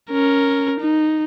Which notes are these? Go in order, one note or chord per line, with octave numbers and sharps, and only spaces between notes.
C#4 A#4
D#4